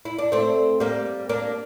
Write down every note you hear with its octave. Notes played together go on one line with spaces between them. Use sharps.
E4
D4
A3 C4
G3 A#3
A#3 D4